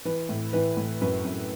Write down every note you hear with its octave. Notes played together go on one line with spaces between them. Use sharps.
E3 B4
A2
E3 B4
A2
F#2 B4
F#2